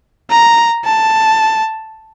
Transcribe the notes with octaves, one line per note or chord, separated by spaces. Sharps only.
A#5
A5